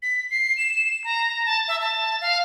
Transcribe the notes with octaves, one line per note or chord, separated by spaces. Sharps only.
B6
C7
E7
A#5
A5
E5
A5
F5